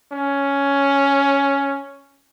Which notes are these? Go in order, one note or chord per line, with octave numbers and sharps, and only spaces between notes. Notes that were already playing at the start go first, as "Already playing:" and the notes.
C#4